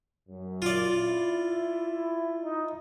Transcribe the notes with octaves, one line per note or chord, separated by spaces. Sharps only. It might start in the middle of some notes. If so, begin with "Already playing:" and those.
F#2
F4 D5
E4
D#4